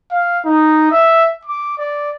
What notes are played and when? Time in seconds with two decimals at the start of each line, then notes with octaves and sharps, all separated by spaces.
0.12 F5
0.45 D#4
0.91 E5
1.45 D6
1.78 D5